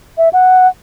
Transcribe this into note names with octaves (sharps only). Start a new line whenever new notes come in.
E5
F#5